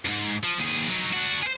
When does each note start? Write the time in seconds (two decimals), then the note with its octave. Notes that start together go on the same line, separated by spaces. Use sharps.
0.05 F2 G#2
0.44 F3
0.58 D#2 G#4
0.88 F#3 D#4
1.13 D4 F#4
1.43 G#4 C5